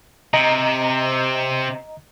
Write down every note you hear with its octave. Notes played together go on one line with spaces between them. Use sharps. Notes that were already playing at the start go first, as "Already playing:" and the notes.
C3 D#5 A#5